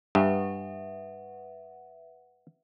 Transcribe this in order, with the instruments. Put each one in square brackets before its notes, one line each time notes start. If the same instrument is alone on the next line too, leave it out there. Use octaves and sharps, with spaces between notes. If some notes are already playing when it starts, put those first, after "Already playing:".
[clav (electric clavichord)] G2 [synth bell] B4 E5 F#5